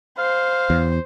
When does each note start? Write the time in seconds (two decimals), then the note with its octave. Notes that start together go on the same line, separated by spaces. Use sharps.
0.18 C5 F5
0.70 E2